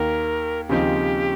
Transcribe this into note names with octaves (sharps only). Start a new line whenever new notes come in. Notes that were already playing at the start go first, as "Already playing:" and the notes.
Already playing: D#2 D#3 A#3 A#4
D#2 C#3 F3 C4 D#4 G4